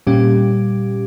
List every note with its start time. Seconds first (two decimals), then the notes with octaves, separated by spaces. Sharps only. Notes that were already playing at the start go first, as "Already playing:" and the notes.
0.07 A#2 G3 C#4 G4